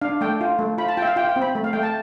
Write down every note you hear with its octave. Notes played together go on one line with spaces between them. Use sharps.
D4 F5
A3 G5
F4
A3
F4 B5
A5
F4 E5 G5
F5
F4 G5
G5
C4
B5
A3
F5
A3 G5
A5